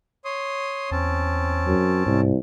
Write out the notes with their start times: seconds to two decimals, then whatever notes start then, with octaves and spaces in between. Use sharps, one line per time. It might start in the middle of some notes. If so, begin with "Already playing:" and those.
0.25 C#5 C6 D#6
0.91 E2 C4 C#4 A5
1.67 F#2
2.06 C2 G#2